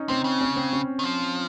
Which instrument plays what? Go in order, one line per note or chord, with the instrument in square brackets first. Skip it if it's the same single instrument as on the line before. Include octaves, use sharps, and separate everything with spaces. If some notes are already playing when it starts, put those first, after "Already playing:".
Already playing: [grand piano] C#4 D#4
[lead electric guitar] C3 [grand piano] C4
[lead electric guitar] C#3
[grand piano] C#4
C4
C#4
[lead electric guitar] D#3
F3